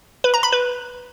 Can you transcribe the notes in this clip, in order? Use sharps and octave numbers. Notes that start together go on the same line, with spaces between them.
B4
A#5
B5
B4